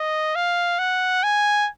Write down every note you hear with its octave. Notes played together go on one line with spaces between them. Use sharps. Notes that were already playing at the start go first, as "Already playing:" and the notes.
Already playing: D#5
F5
F#5
G#5